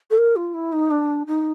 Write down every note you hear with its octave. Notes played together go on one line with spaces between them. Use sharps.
A4
A#4
F4
E4
D#4
D4
D#4